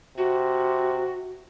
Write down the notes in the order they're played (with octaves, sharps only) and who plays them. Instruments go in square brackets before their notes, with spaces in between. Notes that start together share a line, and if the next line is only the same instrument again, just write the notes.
[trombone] C3 [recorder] F#4